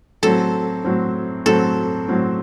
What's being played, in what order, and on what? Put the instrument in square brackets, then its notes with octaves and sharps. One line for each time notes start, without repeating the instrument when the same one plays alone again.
[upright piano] A2 F#3 C4 [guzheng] A4
[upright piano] A2 F#3 C4
[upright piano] A2 F#3 C4 [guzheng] A4
[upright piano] A2 F#3 C4